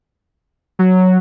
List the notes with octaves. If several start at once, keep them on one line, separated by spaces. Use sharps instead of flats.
F#3